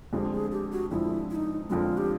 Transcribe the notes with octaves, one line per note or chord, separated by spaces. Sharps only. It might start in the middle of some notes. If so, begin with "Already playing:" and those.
F2 D3 F3 G#3 G4
G#4
G4
F#4
F2 D3 F3 G#3 E4
E4
D#4
F2 D3 F3 G#3 F4 F#4
G4